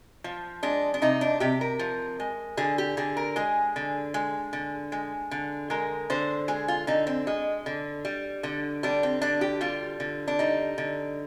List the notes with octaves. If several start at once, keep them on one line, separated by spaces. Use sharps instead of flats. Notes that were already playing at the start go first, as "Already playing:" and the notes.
F3
G#3 D4
D4
C3 D#4
D4
C3 G4
A#4
F3
G#3
D3 G#4
G4
D3 G#4
A#4
G#3 G#4
D3
G#3
D3
G#3
D3
G#3 A#4
D3 C5
G#3 G#4
F4
D3 D#4
C4
G#3
D3
G3
D3
G3 D4
C4
D3 D4
G4
G3 F4
D3
D4
G3 D#4
D3